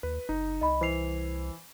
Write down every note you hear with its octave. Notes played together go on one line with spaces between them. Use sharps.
D#2 B4
F#1 D#4
C2 D#5 B5
E3 C5 C7 F7